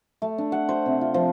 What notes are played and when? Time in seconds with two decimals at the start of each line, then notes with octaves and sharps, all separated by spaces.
0.22 A3
0.38 D4
0.52 F#5
0.69 C5
0.86 C3
1.01 F4
1.14 F3